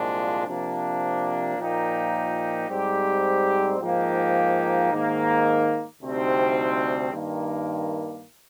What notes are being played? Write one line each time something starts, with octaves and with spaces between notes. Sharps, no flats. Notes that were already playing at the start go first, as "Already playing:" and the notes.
Already playing: C2 A#2 F3 G#3 D4
C3 F3 A#3 D4
A#2 F3 A#3 D#4 G4
G#2 G3 C4 G4
G#2 F3 A#3 D#4 G4
G#2 D#3 A#3
D2 C3 G3 C4 D#4
G2 D#3 A#3